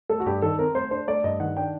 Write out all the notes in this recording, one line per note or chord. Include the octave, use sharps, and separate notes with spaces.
A3 A4
F#4
G2 G4
D#3 A4
C4 A#4
A3 C5
D4 C5
A3 D5
G2 D#5
D#3 F#5
D4 G5